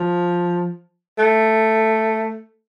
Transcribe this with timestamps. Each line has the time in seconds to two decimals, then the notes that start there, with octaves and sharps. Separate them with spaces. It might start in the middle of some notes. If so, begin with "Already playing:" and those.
Already playing: F3
1.18 A3